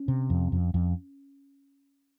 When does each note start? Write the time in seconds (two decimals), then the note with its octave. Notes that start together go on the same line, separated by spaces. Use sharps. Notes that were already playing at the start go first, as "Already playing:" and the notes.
Already playing: C#4
0.08 C3
0.30 F2
0.52 F2
0.74 F2